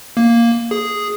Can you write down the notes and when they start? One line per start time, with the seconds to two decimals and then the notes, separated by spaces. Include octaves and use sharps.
0.17 A#3
0.71 G#4